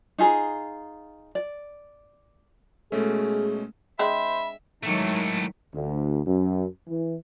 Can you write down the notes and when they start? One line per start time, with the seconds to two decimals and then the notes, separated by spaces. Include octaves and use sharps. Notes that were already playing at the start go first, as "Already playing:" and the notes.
0.18 D#4 F4 G#4 A#5
1.35 D5
2.92 B2 G#3 A3 C#4 G#4
3.99 G#3 C4 D4 C5 E5 B5
4.83 G#2 D#3 E3 F#3 A3
5.74 D2
6.26 F#2
6.88 E3